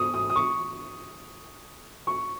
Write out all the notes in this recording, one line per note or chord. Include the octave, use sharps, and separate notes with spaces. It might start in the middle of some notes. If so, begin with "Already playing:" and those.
Already playing: C#6 D#6
D#6
D#6
C#6
C#6